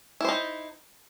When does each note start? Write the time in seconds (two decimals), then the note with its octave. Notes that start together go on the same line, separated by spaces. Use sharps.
0.21 E4
0.25 C5
0.29 D#4